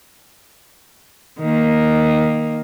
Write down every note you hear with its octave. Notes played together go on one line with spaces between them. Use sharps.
D#3 A#3